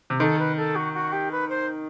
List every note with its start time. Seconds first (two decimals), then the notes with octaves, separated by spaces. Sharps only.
0.10 C3
0.20 D#3 A4
0.39 B4
0.56 A4
0.75 F#4
0.94 F#4
1.12 G4
1.31 B4
1.49 C5